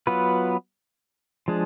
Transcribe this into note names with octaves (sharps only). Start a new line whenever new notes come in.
F#3 B3 F4 B4
F3 G#3 D4 G#4